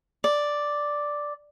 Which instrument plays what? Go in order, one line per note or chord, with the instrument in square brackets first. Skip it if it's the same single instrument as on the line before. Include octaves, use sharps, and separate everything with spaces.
[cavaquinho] D5